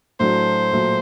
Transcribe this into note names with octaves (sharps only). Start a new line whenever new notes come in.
A2 F#3 A3 D4 C5
A#2 F#3 A3